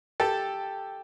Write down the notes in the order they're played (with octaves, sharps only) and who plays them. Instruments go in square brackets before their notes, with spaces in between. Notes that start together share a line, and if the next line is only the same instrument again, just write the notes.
[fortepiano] G4 A4